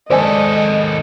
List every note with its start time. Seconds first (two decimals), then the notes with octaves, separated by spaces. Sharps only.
0.10 D#2 G#3 A4 C5 D5 D#5 G#5